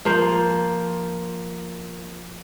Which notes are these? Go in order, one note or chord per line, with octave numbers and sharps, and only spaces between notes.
F3 A#3 C5